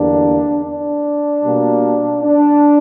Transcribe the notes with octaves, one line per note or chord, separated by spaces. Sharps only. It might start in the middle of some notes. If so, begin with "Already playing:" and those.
Already playing: E2 D3 G3 A#3 D4
D4
B2 G3 A#3
D4